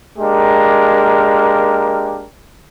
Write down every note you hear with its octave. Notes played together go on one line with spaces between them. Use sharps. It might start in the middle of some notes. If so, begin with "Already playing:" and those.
G#3 A#3 D4 G4 A#4